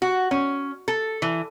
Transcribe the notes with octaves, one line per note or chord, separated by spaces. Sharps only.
F#4
C#4
A4
E3